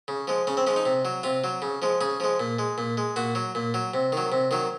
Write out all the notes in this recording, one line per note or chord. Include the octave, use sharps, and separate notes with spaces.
C#3
F3 G#3
C#3 C#4
C4
F3 G#3 C#4
D#4
C3
F#3
C3 F4
F#3
C#3
F3 G#3
C#3 G#4
F3 G#3
A#2
G#3
A#2
G#3
A#2 F#4
F#3
A#2
F#3
C3
D#3 F#3
C3
D#3 F#3